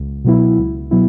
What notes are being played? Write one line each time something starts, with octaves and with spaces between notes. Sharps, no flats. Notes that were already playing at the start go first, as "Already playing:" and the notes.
Already playing: C#2
B2 F#3 B3 E4
C#2
B2 F#3 B3 E4